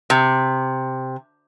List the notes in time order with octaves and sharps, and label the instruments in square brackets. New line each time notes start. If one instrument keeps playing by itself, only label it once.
[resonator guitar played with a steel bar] C3